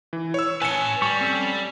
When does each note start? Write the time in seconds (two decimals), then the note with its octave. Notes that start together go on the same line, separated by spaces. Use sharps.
0.13 E3
0.34 C#5 E6
0.62 B4 G#5 A5 C#7
1.02 G3 C#6
1.21 C4 C#4 A4